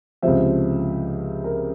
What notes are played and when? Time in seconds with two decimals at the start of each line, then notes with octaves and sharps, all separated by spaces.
0.22 C#2 C3 F3 E5
1.44 A#4